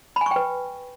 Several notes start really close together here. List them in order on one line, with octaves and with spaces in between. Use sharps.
B5 G#5 C#6 G5 B4